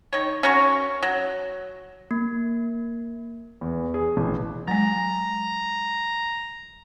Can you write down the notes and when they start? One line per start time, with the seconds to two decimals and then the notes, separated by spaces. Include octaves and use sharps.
0.13 D#3 C#5
0.43 C#4 F#4 A#4 C#6
1.03 F#3
2.11 A#3
3.61 E2
3.94 G#4
4.17 A1
4.68 F#3 G#3 A#5